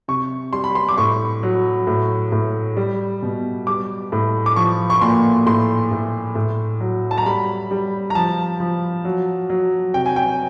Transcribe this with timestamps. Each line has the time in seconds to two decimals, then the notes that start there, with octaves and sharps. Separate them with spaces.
0.08 C3 C#6
0.53 G3 C6
0.64 B5
0.75 C6
0.89 D6
0.98 A2 C#6
1.43 F#3
1.87 A2
2.32 A2
2.77 G3
3.22 B2
3.67 G3 D6
4.12 A2
4.46 D6
4.56 F3 C#6
4.90 C#6
5.01 A#2 C6
5.46 A2 C6
5.91 A2
6.35 A2
6.80 F#3
7.11 A5
7.18 A#5
7.25 G3 B5
7.71 G3
8.10 A#5
8.15 F3 A5
8.60 F3
9.05 F#3
9.49 F#3
9.94 C3 G5
10.06 G#5
10.16 G5